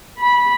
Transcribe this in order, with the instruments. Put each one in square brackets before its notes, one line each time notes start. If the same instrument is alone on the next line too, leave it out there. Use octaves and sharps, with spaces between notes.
[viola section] B5